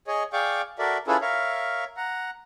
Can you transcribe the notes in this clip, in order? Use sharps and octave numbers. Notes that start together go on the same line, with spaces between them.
G#4 C#5 D#5
G#4 D5 F5 G5 C#6 D6
F#4 A4 A#4 D5 E5
C#4 E4 F4 G#4 A4 B4
A#4 C#5 E5 F5
F#5 A#5